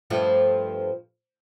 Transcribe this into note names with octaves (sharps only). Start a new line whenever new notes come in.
G2 F3 A3